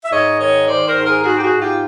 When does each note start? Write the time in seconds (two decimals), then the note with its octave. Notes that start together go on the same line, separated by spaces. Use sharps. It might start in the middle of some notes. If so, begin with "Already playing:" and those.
0.05 E5
0.11 G#2 C#5 D#5
0.39 D#3 C#5 D#5
0.67 D#3 C5 D5
0.86 A#4 C5
0.95 G#2
1.05 G#4 A#4
1.23 G#2 F#4 G#4
1.37 G4
1.42 F#4 G#4
1.51 G#2
1.60 F4 G4